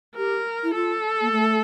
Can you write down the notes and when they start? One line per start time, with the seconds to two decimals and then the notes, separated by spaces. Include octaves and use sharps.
0.17 G4 A#4
0.64 E4
0.75 F4 A4
1.21 A#3
1.32 A3